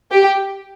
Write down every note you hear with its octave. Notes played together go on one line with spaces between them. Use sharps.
G4